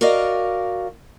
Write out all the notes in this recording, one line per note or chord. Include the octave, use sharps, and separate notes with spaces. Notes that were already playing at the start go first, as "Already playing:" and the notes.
F#4 A#4 D5 D#5 F5